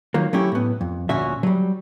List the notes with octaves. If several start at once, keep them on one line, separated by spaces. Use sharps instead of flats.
D#3 F3 F#3 A#3
F#3 A3 C#4 E4 G4
A2 B3
F2
D2 A#2 C#4 F#4 E5
F#3 G3